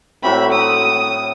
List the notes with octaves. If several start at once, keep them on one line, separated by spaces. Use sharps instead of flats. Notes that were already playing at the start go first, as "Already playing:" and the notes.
A2 F#3 C4 E5 B5
D#6